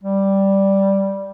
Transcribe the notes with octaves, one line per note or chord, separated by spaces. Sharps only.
G3